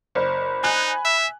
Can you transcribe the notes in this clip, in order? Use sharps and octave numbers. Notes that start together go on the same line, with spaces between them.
F#1 C5 D5 B5
D#4 G#5 F#6
E5